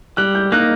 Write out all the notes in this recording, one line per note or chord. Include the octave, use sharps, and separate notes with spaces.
G3 F#6
G6
A#3 D#4 F#6